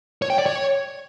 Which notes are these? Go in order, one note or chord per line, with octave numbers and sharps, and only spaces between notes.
C#5
G5
D5
C#5